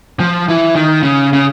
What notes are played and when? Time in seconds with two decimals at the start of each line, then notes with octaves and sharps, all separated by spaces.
0.20 F3
0.48 E3
0.76 D#3
1.03 C#3
1.33 C#3